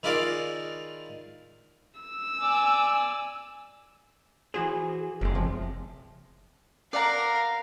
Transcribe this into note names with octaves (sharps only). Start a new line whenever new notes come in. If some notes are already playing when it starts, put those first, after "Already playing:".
D#3 E4 F4 G#4 A#4 D5
E6
D5 G#5 D6
E3 F#4 G#4 C5
F#1 E2 G#3
C3 F3
A#4 D5 F5 F#5 A#5